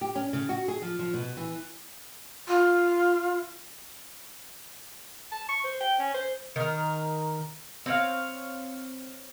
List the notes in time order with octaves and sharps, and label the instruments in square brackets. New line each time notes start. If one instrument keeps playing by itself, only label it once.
[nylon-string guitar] G4
C#4
C#3
F#4
G#4
F3
F3
B2
E3
[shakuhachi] F4
[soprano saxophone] A5
C#6
C5
G5
C#4
C5
[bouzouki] D#3 A#4
C4 C#5 F5